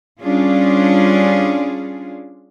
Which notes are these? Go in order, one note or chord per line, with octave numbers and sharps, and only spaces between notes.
G3 C#4 D4 F4 G#4